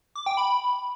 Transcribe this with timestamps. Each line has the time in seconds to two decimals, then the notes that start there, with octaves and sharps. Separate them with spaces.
0.15 D6
0.26 G5
0.37 B5